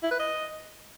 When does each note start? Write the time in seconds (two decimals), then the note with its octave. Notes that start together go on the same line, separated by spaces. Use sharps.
0.03 E4
0.11 B4
0.19 D#5